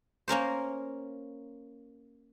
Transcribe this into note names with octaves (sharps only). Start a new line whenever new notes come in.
A#3 C#4 A#4 C5